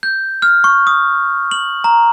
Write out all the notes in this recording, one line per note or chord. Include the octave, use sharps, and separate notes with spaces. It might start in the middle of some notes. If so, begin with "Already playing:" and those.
G6
F6
C#6
D#6
F#7
A#5